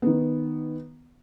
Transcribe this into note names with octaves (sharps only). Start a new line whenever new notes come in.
D#3 B3